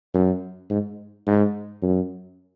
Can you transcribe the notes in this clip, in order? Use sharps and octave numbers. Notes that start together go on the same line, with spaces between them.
F#2
G#2
G#2
F#2